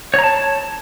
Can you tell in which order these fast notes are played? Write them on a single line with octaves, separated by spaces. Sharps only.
C#5 A#5 A5